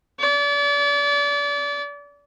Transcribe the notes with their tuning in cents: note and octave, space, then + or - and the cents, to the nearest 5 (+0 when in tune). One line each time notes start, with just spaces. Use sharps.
D5 -35